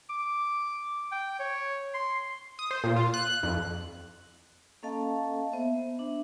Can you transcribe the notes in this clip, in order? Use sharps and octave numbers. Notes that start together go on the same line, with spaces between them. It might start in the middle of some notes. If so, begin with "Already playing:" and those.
D6
G5
C#5
C6
D#6
C5
A#2
F4
F#6
F2
A#3 C#4 A4 D#5 F5 A5
B3 C5 E5
D4 E5